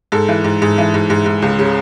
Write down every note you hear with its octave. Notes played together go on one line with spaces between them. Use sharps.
G#2 A4
E3
G#2
G#2
E3
G#2
G#2
G#2
C#2
C#3